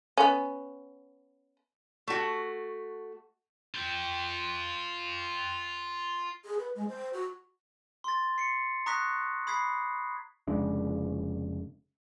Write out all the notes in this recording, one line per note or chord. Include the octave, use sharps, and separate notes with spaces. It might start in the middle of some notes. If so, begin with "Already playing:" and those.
B3 C#4
A3 F#4
F4 G5
G#4
B4
G#3
C5
F#4
C6 A6
C7 C#7
A#5 C#6 D#6 F#6 A#6 B6
B5 D#6 G#6 B6 C7
F1 C#3 G#3 D4